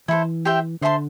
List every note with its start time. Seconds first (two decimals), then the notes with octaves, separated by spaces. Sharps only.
0.08 E3 E4 A4 C5
0.45 G4 C5 E5 G5
0.81 D3 C5 E5 A5 C6